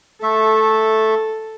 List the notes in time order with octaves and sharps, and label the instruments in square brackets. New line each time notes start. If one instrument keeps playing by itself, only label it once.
[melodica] A3 E5 [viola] A4